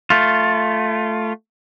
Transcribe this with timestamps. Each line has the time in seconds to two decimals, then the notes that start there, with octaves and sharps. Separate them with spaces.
0.10 A3 F4